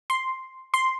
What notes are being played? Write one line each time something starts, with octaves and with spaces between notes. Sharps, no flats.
C6
C6